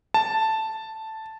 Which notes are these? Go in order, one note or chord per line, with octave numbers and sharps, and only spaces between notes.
A5